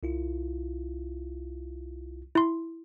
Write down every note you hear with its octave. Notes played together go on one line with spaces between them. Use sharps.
C2 E4 F4
E4 C6